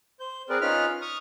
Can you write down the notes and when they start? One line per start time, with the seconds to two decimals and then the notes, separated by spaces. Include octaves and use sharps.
0.20 C5 G6
0.50 C4 G#4 A#4 B4 D5
0.61 C#4 D#4 F4 B4 B5 F6
1.02 C#6 D#6 F6